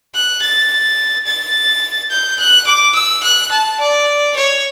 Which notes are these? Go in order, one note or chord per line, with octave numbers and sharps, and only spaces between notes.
F#6
A6
A6
G6
F#6
D6
E6
F#6
A5
D5
C#5